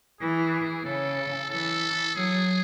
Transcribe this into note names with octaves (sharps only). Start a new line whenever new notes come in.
E3 G#4
C#3 A4
E3 A4
F#3 G#4